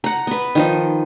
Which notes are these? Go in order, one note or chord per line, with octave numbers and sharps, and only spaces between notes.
F#5 A#5
B3 B4
D#3 F3 D#4